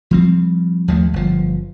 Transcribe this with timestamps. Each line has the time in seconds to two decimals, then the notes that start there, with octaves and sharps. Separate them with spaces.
0.11 F3 G3 C4
0.88 D#2 F3 G#3 A3
1.13 G1 F3